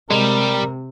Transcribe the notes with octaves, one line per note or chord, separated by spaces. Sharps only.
C3 G3 G#3 A#4